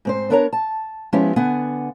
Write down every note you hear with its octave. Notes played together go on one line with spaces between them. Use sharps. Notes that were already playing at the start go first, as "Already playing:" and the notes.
G#2 C4 C5
B3 D4 A#4 C#5 G#5 A#5
A5
F3 G#3 B3 C#4 E4 G4
D3 B3 F#5 G#5